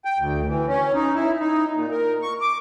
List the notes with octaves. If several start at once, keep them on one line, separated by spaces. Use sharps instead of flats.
G5
D2
E3
C#4
D#4
E4
D#4
A#2
A#4
C#6
D6